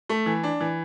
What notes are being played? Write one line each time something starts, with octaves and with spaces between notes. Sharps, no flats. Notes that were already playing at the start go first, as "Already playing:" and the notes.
A3
E3
D4
E3